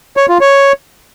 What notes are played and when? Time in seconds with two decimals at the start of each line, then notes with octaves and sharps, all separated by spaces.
0.17 C#5
0.29 F4
0.41 C#5